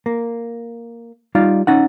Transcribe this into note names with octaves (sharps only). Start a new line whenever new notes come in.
A#3
G3 D#4 F4 D5 F5
C#4 D#4 F#5